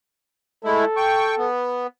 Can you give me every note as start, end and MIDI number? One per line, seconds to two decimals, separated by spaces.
0.65 0.85 56
0.65 0.85 57
0.65 0.85 64
0.65 1.48 69
0.97 1.35 79
0.97 1.35 85
1.38 1.87 59